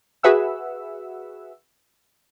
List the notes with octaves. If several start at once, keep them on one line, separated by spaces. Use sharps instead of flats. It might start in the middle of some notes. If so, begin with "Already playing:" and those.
F#4 G#4 B4 E5 F#5 E6